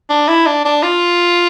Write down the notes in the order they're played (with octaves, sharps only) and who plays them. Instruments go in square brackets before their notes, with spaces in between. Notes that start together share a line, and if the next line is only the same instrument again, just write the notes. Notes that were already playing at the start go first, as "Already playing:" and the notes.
[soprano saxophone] D4
E4
D4
D4
F4